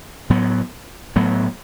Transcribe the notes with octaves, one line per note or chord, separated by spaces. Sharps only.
A2 F#3 B3
A2 F#3 B3